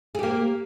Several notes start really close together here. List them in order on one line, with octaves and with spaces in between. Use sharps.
G#4 G4 A#3